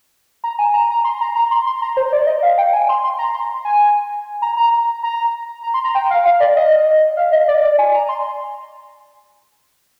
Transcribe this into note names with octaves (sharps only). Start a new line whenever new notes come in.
A#5
G#5
A#5
A#5
C6
A#5
A#5
C6
C6
A#5
C5
D5
D#5
F5
G5
G#5
C6
C6
A#5
C6
G#5
A#5
A#5
A#5
A#5
C6
A#5
G5
F5
F5
D5
D#5
F5
D#5
D5
D5
G#5
A#5
C6